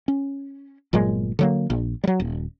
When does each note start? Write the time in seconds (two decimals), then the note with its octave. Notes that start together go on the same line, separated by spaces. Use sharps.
0.08 C#4
0.93 G1 A#2 F#3 G#3
1.39 D3 F#3 A#3
1.70 A#1
2.04 F#3 G3
2.20 D#1